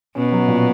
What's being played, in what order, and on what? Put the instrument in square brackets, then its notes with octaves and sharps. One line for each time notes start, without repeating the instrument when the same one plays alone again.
[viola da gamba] B2 [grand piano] C#4
[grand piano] F#3
A#2